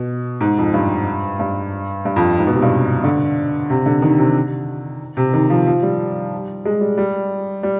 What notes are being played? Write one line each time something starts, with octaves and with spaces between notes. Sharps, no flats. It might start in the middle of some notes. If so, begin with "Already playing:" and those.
Already playing: B2
G#2
F2
G2
G2
G2
F2
G#2
B2
C3
G2
D3
C3
D3
D#3
C3
C3
D#3
F3
F3
G3
G#3
G3
G3
G3